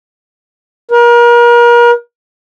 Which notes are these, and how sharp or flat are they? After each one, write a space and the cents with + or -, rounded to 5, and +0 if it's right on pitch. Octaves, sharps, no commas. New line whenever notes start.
A#4 +35